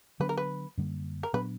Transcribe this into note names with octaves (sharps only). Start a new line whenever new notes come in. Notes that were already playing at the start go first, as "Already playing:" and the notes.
D3 F#3 B3 D4 B4
A#4
B4
F#2 D3 G3 A#3
A#4
A#2 F#3 B3 D4 B4